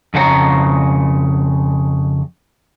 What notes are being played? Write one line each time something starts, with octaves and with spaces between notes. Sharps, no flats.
F2 C#3 F#4 C#5 A#5